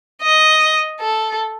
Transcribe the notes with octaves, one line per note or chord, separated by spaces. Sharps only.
D#5
A4